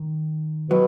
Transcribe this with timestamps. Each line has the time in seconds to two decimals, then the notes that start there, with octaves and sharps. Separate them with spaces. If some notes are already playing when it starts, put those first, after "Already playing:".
Already playing: D#3
0.70 B2 F#3